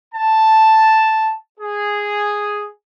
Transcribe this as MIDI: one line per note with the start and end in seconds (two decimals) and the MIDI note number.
0.15 1.33 81
1.59 2.65 68